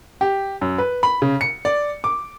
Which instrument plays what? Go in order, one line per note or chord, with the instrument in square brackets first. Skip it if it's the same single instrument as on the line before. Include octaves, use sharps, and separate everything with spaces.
[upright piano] G4
F#2
B4
B5
C#3
C#7
D5
D6